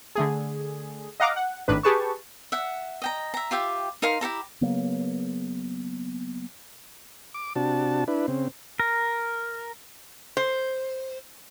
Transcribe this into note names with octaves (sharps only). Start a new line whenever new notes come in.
D3 A3 G#4
D#5 F5 F#5 A#5 D6
F#5
G#1 A2 D#3 D4 B4
G4 G#4 B4 A5 C#6
E5 F#5
D#5 G5 A#5
E5 A#5
F4 G4 E5 G5
D#4 A#4 F5 C6
E4 G4 A4 A#5
C#3 F#3 A#3 B3
D6
C3 D4 F#4 A5
D4 E4 B4
C#3 C4
A#4
C5